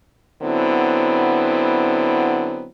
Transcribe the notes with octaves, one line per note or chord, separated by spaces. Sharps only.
D3 F#3 B3 C4 E4